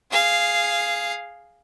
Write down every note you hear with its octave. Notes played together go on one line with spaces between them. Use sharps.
G#4 F5